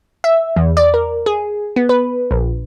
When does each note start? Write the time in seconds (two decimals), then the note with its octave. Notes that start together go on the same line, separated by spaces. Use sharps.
0.24 E5
0.56 E2
0.77 D5
0.94 A#4
1.26 G#4
1.76 B3
1.89 B4
2.31 A#1